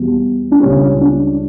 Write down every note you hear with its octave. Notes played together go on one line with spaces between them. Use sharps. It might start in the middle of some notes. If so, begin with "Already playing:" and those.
Already playing: E2 B2 G3
D4
C#2 C#3 G3 C#4
D4